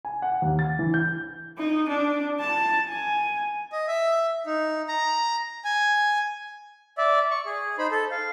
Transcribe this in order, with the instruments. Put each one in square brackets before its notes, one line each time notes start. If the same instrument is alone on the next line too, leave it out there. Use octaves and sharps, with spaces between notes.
[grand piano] G#5
F#5
D#2
A6
E3
G6
[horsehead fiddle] D#4
D4
A5
G#5
[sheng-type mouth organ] D#5
E5
D#4
A#5
G#5
D5 E5
C#6
G#4
D#4 C5 B5
A4
F5